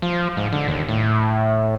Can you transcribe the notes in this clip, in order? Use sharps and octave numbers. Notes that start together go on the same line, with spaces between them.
F3
G#2
D3
D#2
A2